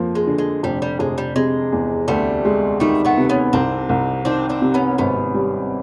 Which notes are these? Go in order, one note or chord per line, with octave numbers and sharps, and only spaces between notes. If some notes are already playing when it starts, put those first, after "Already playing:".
Already playing: F2 F3 A#3
G#3
D3
G#3
F1 G3
G3
F1 G#3
G3
C3 G#3
E2
D2 G3 A3
G#3
D#3 G3 A3
A3 B3
C3
B3 C#4
C2 C4 D4
C2
D#3 C4 D4
C4 D4
C3
B3 C#4
G#1 B3 C#4
G3